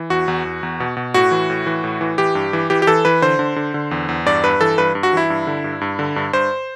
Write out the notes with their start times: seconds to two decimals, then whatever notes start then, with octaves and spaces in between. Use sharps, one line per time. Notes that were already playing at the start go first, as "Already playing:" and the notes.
Already playing: E3
0.10 E2 F#4
0.28 E2
0.45 E2
0.63 E2
0.80 B2
0.97 B2
1.14 A2 F#4
1.31 E3
1.50 A2
1.66 E3
1.84 A2
2.01 E3
2.18 E3 G4
2.35 G2
2.53 E3
2.70 E3 G4
2.82 G4
2.87 E3 A4
3.05 E3 B4
3.22 D3 C5
3.39 D3
3.56 D3
3.74 D3
3.91 E2
4.09 E2
4.26 G2 D5
4.44 G2 B4
4.61 E3 A4
4.78 G2 B4
4.95 G2
5.03 F#4
5.13 E3 E4
5.30 G2
5.47 D3
5.64 G2
5.81 G2
5.99 D3
6.16 G2
6.33 G2 C5